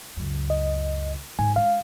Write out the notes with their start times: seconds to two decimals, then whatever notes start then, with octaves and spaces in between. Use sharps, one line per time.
0.17 C#2 F#2
0.50 D#5
1.39 G#2 G#5
1.56 G#3 D4 F5